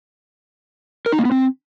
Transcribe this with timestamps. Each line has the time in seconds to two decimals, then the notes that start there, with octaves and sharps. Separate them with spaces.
1.06 A#4
1.12 D#4
1.19 A#3
1.25 B3
1.32 C4